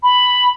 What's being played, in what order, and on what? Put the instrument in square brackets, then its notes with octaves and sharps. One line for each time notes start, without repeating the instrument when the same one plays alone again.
[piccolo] B5